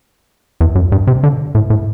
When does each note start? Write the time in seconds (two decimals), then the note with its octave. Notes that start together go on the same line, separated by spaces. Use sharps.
0.61 E2
0.75 F#2
0.92 G2
1.07 C3
1.23 D3
1.55 A2
1.70 A2